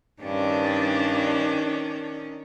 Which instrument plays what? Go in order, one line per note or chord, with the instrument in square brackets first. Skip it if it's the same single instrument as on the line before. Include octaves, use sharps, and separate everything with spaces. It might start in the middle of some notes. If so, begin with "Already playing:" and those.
[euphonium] G2 [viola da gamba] D#3 C#4 [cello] D4